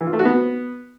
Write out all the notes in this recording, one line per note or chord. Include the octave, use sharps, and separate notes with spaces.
E3
F4
A3
F#4
B3